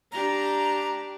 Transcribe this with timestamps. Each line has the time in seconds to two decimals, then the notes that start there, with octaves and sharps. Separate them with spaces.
0.12 D4 G4 A#5